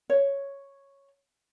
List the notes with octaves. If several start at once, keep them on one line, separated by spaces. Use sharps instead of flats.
C#5